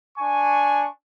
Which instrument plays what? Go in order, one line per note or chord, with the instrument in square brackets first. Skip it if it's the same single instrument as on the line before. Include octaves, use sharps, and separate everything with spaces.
[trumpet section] D4 G#5 C#6